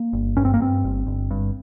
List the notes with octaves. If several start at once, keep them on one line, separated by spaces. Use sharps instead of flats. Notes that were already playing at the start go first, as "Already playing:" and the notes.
Already playing: A#3
G1
G2 C#4
C4
A#3
G2 C4
G1
G1
G2